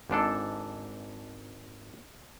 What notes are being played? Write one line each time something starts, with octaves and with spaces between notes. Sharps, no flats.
G#1 G#2 D4 A4